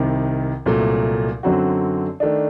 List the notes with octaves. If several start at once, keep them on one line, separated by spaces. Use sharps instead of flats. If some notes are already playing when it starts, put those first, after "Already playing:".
Already playing: C2 C3 D#3
C2 A#2 F#3 A3
F#2 D3 F#3 C4 F#4
D#3 A3 D4